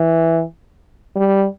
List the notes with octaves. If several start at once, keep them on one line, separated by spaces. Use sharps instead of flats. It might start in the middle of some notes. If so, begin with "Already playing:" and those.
Already playing: E3
G3